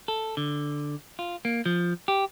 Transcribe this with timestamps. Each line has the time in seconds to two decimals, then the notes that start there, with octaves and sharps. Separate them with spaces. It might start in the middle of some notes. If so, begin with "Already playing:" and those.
0.08 A4
0.37 D3
1.19 F4
1.45 A#3
1.66 F3
2.08 G4